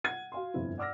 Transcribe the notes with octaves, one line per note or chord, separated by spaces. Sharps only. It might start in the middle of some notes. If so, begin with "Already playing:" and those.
F#5 G#6 D#7
F#4 F5 C6
G1 F2 E4
D5 F#5 D6 E6 F6 A#6